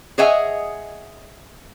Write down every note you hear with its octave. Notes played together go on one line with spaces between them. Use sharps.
G#4 C#5 D#5 E5 F#5 G#5